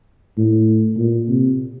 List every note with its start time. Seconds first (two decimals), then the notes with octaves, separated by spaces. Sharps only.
0.37 A2
0.97 A#2
1.28 C3